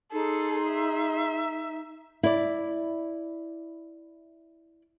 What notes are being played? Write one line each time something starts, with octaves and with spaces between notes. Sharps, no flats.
D#4 G#4 A4 C6
E5
E4 D5